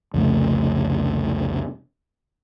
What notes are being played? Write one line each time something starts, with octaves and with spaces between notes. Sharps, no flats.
C2 F2 C#3 A3